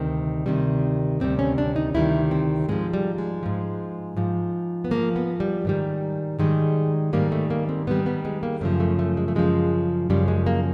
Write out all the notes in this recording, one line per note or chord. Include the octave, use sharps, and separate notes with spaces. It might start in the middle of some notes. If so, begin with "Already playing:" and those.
Already playing: D2 C3 D#3 G3 C4
D2 C3 D#3 G3
D2 C3 D#3 G3 C4
C#4
D4
D#4
D2 C3 D#3 G3 E4
C4
G#2 F3 G#3
G3
G#3
G#2 F3
G#2 F3
B3
G#2 F3 A#3
B3
G3
G#2 D#3 G3
G#2 D#3 G3 G#3
G#2 D#3 G3 A#3
A3
A#3
C4
G#2 D#3 G3 B3
B3
G#3
A#3
F#2 C#3 F3 A3
A3
A3
G#3
A3
F#2 C#3 F3 G#3
F#2 C#3 F3 G3
G#3
A#3